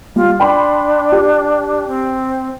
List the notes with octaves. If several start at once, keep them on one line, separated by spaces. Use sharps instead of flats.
G3 F4
D4 G5 B5 C6
G4
C4